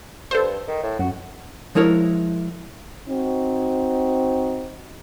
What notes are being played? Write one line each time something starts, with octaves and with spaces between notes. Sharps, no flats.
G2 A4 C5
D#3
A2
F#2 F#4
F3 G#3 E4 A#4 C#5
C4 D#4 F#4